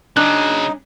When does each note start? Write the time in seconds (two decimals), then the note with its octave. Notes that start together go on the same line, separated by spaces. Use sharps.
0.17 C#3 F#3 D4 D#4 G#5 F#6